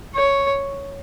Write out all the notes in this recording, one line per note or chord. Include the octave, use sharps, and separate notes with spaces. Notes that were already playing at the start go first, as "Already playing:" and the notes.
C#5